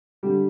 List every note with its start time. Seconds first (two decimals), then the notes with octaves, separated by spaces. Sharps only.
0.23 D3 G3 G4